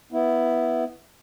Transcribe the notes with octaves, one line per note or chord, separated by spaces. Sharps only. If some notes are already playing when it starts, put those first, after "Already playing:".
B3 E4